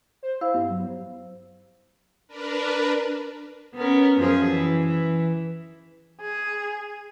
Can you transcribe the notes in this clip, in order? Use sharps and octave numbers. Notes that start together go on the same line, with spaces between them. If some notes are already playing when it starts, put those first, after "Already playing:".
C5
E4 C5 F5 E6
G2 B3
F#3
D4 A#4 B4
B3 C#4 A#4
F#2 F3 G#4
E3
E3
G#4